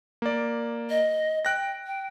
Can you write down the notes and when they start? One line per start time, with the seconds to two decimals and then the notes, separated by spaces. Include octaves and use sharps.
0.22 A#3 D5
0.90 D#5
1.45 G5 F#6 A#6
1.86 G5